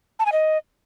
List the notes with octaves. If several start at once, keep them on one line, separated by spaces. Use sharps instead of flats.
A5
G#5
D#5